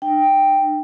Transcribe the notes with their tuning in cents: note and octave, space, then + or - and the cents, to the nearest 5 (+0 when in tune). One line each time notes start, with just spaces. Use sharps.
D4 +45 G5 +0